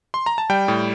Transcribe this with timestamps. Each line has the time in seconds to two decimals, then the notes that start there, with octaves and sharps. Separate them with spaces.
0.14 C6
0.26 A#5
0.38 A5
0.50 G3 G5
0.68 A2